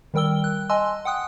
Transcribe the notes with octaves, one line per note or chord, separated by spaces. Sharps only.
D#3 G3 A#4 G5 E6 G7
F#6
D#5 G#5 A5 C6 E6
F#5 G5 D#6 F#6